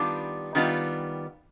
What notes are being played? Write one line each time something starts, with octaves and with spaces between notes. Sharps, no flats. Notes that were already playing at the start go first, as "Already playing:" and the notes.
Already playing: D#3 G3 B3 D4 F4
D#3 G3 B3 D4 F4